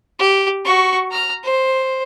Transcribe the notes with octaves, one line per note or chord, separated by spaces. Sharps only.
G4
F#4 C#6
A#5 F6
C5